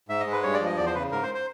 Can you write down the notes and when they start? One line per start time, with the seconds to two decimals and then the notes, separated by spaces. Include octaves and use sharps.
0.08 G#2 E5
0.20 D#5
0.26 G#3
0.32 B4
0.43 G2 C#5
0.54 D5
0.60 F3
0.66 D#5
0.77 E2 D5
0.86 C5
0.94 C#3 B4
1.12 G#2 A#4
1.23 C5
1.34 C5